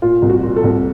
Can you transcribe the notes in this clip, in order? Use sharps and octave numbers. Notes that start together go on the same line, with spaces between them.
A#2 F4
C2
F#4
A#2
A4
C2